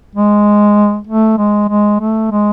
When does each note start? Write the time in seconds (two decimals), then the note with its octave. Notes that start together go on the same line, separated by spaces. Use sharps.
0.15 G#3
1.07 A3
1.38 G#3
1.69 G#3
2.00 A3
2.32 G#3